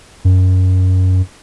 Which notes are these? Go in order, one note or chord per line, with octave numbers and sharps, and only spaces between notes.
F#2